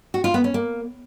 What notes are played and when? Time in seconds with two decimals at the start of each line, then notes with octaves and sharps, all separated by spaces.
0.14 F#4
0.24 F4
0.34 B3
0.44 C#4
0.54 A#3